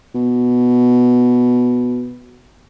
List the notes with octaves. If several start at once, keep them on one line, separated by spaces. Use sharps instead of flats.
B2